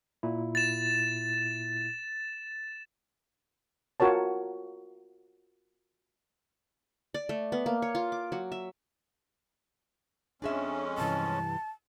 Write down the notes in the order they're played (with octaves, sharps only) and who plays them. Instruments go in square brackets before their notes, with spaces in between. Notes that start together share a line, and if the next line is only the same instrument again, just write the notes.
[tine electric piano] A#2 E4
[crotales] A6 E7
[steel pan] F4 F#4 A#4 C#5 A5
[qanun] D5
A3
B3
A#3
C#5
F4
D6
F#3
E5
[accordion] F2 G#3 C#4 [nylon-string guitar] D4 G#4 E5
[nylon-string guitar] G2 C3 E3 [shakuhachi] A5